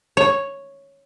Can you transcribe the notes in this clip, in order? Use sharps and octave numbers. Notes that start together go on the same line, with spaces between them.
C#5